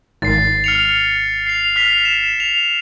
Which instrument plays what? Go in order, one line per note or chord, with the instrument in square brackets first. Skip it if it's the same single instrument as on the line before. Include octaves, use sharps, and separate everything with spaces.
[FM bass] G#1 [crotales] A6 C7
[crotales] F6 C#7 F7
C7 F7
F6 B6 F7
E7
F7